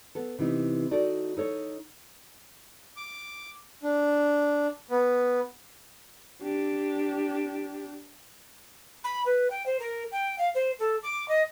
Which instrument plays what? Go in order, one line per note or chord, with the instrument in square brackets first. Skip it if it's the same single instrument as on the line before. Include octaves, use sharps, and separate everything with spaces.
[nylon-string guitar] B3 A4
C3 E3 B3 D#4
D#4 F#4 A4 D5
D#4 A4 C#5
[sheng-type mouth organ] D6
D4
B3
[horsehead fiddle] D4 G4
[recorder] B5
B4
G5
C5
A#4
G5
F5
C5
A4
D6
D#5